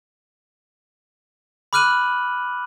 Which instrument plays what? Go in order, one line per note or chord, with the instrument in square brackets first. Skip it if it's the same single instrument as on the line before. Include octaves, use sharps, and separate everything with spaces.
[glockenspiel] B5 D6 F6 F#6 D#7 F#7